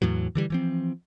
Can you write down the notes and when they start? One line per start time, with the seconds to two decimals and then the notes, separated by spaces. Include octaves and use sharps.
0.02 E2 A2 E3 F#3
0.35 D3 E3 G3
0.50 E3 F3 C4